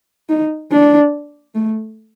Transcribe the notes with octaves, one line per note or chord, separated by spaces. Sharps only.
D#4
D4
A3